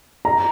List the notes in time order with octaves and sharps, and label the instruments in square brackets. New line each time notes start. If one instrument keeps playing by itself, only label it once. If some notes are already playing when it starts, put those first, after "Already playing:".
[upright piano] A#5